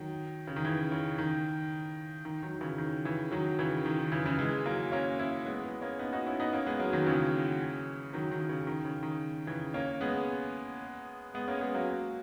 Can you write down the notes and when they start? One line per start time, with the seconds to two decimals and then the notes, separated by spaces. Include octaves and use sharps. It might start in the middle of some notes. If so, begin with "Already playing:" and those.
Already playing: D#3 F#3
0.47 C#3
0.56 D#3
0.64 C#3 E3
0.92 C#3
1.18 D#3
2.25 D#3
2.43 D#3 F#3
2.61 C#3 E3
2.78 D#3
3.05 C#3 E3
3.31 D#3 F#3
3.59 C#3 E3
3.86 D#3
3.99 D#3
4.12 C#3 E3
4.25 C#3 E3
4.39 E3 G#3
4.66 F#3 A#3
4.92 A#3 C#4
5.19 C#4 E4
5.46 G#3 B3
5.64 G#3 B3
5.81 A#3 C#4
5.99 B3 D#4
6.12 D#4 F#4
6.26 C#4 E4
6.40 B3 D#4
6.53 A#3 C#4
6.66 G#3 B3
6.79 F#3 A#3
6.93 D#3 F#3
7.06 C#3 E3
8.13 D#3 F#3
8.31 D#3
8.49 C#3
8.67 D#3
8.85 C#3
9.03 D#3
9.47 C#3 E3
9.74 A#3 C#4
10.01 G#3 B3
11.34 G#3 B3
11.48 A#3 C#4
11.61 G#3 B3
11.74 F#3 A#3